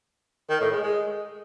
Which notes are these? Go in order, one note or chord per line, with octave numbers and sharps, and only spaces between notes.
D#3
A2
G#3
G#3